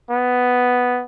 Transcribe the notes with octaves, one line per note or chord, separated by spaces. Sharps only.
B3